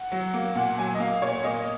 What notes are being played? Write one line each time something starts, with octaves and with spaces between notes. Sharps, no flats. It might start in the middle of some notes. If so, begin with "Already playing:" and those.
Already playing: F#5
F#3
A#3
A#2 F#5
F#3 G#5
D#5
A#3 F5
A#2 C#5
A#3 D#5